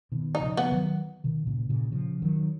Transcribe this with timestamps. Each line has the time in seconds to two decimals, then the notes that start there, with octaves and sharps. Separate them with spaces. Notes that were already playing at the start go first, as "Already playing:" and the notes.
0.12 B2 D#3
0.35 D#4
0.42 C#3 F3
0.57 B3
0.72 D#3 F#3
1.24 B2 D#3
1.47 A#2 C#3
1.69 A#2 C#3
1.92 C#3 F3
2.22 D#3 F#3